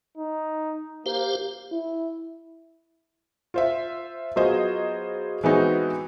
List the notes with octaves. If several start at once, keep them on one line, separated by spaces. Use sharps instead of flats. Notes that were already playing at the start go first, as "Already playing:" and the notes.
D#4
A#3 G4 C5 F5
E4
F4 C5 E5
F#3 B3 F4 G#4 C5 D#5
E3 G#3 B3 C4 D#4 F#4